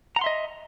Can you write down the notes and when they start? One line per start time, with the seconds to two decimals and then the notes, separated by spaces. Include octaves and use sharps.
0.16 A#5
0.19 F#5
0.21 C6
0.24 E5
0.26 D#5